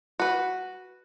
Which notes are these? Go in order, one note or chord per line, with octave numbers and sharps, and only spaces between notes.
F#4 B4